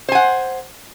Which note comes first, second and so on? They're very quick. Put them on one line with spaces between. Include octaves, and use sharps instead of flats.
C5 G#5 F#5